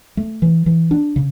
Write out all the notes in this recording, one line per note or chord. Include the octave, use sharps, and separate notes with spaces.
A3
E3
E3
D4
C#3